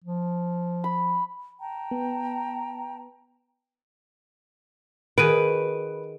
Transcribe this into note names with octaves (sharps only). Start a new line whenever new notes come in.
F3
B5
G5 A5 A#5
B3
D#3 F#4 G#4 B4 D7 D#7